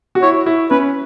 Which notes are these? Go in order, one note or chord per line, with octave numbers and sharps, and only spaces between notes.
F#4
E4 C#5
E4
C#4 B4